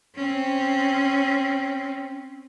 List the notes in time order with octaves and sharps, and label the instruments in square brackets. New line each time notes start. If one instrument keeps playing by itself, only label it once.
[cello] C4 C#4